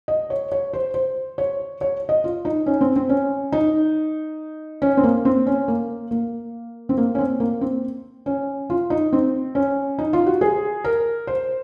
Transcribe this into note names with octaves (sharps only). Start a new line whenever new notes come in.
D#5
C#5
C#5
C5
C5
C#5
C#5
D#5
F4
D#4
C#4
C4
C4
C#4
D#4
C#4
C4
A#3
C4
C#4
A#3
A#3
C4
A#3
C#4
C4
A#3
C4
C#4
F4
D#4
C4
C#4
D#4
F4
F#4
G#4
A#4
C5